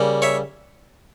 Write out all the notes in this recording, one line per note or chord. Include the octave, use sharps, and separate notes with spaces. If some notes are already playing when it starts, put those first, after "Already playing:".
Already playing: C#3 G3 A#3
C#5 E5